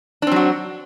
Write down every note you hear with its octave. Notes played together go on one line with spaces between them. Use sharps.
F#3 C4 D4 F#4